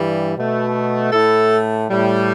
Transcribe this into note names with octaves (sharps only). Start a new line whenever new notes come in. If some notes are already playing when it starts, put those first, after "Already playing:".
Already playing: G2 E3 G3
B2 A3
A2 A3 E4 A4
A2 G3